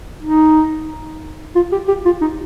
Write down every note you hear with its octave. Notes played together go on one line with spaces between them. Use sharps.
D#4
F4
G4
G4
F4
D#4